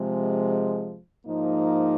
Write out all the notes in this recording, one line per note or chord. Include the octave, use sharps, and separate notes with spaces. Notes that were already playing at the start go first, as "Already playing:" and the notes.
Already playing: C3 F3 G#3
G#2 F3 A#3 D#4